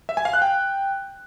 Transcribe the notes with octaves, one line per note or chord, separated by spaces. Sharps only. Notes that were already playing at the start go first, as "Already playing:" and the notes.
E5
G#5
F5
F#6
G5